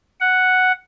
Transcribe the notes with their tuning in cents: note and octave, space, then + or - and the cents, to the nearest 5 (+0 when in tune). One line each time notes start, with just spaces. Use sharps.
F#5 +0